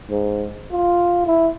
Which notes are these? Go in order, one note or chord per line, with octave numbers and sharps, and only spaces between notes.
G#2
F4
E4